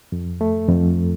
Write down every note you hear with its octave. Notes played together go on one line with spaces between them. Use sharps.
F2
A3
F2